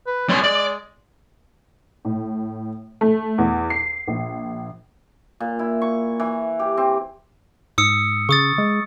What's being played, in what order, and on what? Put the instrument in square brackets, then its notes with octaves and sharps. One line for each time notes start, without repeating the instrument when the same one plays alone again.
[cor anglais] B4
[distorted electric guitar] G3 C6 [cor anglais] C#5
[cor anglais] G#3 [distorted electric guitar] D5
[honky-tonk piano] A2
A3
E2
C7
A#1
[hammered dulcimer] A#2
E4
C#6
E3
G4
C4
[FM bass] G#2 [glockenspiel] D#6 E6 C#7
[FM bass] C#3 [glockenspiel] C#6 D#6 A6
[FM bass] G#3